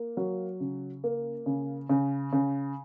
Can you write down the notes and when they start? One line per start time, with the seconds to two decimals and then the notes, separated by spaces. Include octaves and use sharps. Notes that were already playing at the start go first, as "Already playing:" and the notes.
Already playing: A#3
0.17 F#3
0.60 C#3
1.04 A#3
1.46 C#3
1.89 C#3
2.33 C#3